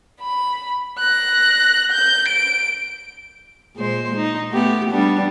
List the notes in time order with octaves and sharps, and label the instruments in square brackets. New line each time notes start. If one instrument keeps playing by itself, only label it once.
[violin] B5
F#6 A#6
G6
D7
[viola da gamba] A#2 G#3 C5
D#4
A3 B3 G4
G3 B3 D4